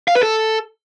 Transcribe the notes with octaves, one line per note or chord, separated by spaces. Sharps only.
F5
B4
A4